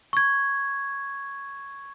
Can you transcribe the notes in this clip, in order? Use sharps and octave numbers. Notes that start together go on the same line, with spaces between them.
C#6 G#6